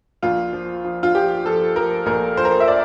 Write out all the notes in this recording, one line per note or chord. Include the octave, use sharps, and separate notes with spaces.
A#1 F4
F3
F3
F4
F3 G4
F3 A4
F3 A#4
A#1 A#4
F3 C5
A#4
C5
E5
D5